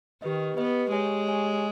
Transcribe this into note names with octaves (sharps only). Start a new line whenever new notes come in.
D#3 G4 B4 D#5
B3 G4 B4 D#5
G#3 G4 C#5 G#5
G4 C#5 G#5